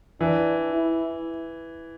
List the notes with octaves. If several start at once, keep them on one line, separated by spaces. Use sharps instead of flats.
E3 D4
E4